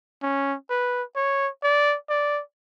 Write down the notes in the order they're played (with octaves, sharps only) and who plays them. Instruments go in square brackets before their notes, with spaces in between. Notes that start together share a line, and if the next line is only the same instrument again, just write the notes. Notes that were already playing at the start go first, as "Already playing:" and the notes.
[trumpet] C#4
B4
C#5
D5
D5